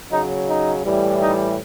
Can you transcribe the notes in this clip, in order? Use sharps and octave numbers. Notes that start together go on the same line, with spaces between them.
C#3 F#3 D#4
D#4
A2 E3 G3
D#4